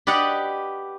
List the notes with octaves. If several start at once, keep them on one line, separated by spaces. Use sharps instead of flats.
G4 B4 D5 D#5 F#5